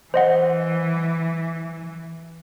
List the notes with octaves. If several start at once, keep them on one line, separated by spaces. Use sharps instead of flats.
E3 C5 D#5 F#5